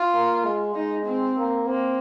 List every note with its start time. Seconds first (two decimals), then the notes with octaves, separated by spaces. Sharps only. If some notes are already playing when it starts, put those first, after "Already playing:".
Already playing: F4
0.14 A#3
0.45 G#3
0.75 G#3 D#4
1.06 C4
1.37 A#3
1.68 A#3 C4